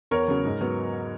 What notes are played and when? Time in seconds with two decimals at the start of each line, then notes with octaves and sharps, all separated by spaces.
0.11 E2 A#4 C#5
0.28 C#3 F#3
0.45 G#2
0.61 F#3 B3